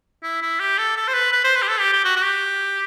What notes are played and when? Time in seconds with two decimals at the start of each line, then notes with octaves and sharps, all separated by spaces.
0.23 E4
0.42 E4
0.60 G4
0.78 A4
0.97 A4
1.08 C5
1.14 B4
1.32 B4
1.44 C5
1.56 B4
1.62 G4
1.68 A4
1.80 G4
1.93 G4
2.05 F#4
2.16 F#4
2.22 G4